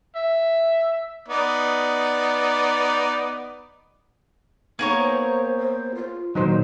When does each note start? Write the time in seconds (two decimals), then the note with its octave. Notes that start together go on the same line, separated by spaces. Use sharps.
0.16 E5
1.28 B3 D#4 D5
4.79 A#3 B3 D#4 G#4 A#4 C#5
4.97 C5
5.58 C5
5.95 F4
6.35 A#2 D3 D#3 F#3 D#4 C5 D#5